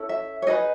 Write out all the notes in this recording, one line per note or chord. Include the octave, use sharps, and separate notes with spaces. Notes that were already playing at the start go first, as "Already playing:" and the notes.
Already playing: C#4 E4 A4
E5
C#5
D#4 G#4 B4 D#5